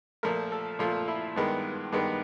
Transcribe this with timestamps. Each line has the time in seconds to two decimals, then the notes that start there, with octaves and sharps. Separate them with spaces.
0.23 A#2 F3 A3 A#4
0.52 A4
0.79 A#2 F3 A3 F4
1.08 E4
1.36 G2 D#3 G#3 B3
1.92 G2 D#3 G#3 B3